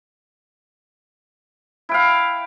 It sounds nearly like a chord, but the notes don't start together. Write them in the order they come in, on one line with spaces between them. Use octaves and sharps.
E4 G5 F5